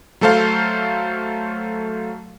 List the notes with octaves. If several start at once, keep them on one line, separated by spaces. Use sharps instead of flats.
F#3 A3 A4 C5 F5